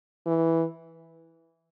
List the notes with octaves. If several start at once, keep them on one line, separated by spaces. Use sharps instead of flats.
E3